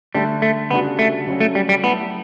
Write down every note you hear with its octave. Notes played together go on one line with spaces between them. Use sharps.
D3 G3 A3 D4 A4
A3
C#3 G3 B3 D4 F#4
A3
C#3 F#3 C#4 F#4 A4
A3
G3
G3
F#3 A3 B3 E4 A4